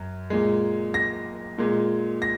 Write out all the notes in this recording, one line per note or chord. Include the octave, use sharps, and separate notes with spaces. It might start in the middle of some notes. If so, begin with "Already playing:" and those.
Already playing: F#2
A#2 G#3
A#6
A#2 G#3
A#6